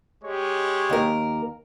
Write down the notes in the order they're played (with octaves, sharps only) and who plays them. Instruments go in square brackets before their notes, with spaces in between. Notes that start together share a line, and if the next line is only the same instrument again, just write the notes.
[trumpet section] G#3 G4 C#5
[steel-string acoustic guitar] D#2 A#4